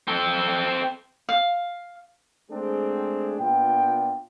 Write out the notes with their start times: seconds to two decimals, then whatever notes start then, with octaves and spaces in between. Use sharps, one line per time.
0.08 C4 A4
1.29 F5
2.50 G#3 A3 C4 D4 G#4
3.39 A#2 B3 D4 F4 G5